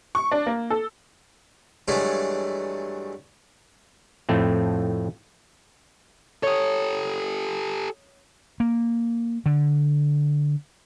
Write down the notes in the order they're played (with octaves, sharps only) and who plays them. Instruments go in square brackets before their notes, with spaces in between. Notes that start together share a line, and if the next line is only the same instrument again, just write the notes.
[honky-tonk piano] C#6
D4
A#3
A4
[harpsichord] G2 E3 F#3 G#3 A3
[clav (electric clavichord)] F2 A2 A3 C4
[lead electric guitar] G4 A4 [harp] C#5 D#6
[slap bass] A#3
D3